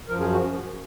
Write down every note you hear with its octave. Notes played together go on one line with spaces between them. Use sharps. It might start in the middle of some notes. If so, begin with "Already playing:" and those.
F#2 F3 A#4
G#4
F#4